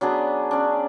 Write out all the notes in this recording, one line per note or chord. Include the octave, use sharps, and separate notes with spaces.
F#3 B3 D4 G#4
C#4 D4